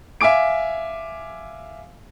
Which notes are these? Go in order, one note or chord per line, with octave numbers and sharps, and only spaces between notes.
E5 F5 G#5 D6 D7